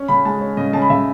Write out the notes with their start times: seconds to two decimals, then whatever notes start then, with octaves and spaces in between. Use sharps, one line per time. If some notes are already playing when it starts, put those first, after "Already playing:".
Already playing: C#4
0.08 C#3 B5
0.25 G#3 A5
0.41 C#4
0.57 C#3 D#5
0.73 C#3 A5
0.82 B5
0.90 C#3 E5